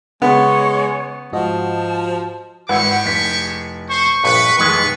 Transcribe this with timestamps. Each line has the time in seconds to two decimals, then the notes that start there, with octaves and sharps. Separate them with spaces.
0.22 C#3 G#3 B3 C#5
1.33 G#2 F3 F#4 D#5 A5
2.69 G#1 G#3 E4 G4 B4 F#5 C#6
3.05 F1 B6
3.89 C5 C#6
4.24 A#1 G2 B4
4.58 F1 D#3 E3 G#3 F4 B4 C#6